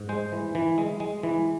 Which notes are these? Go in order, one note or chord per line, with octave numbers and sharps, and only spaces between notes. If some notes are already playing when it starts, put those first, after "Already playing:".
Already playing: G#2
G#3 C5
E3
E3
G#3
G#3
E3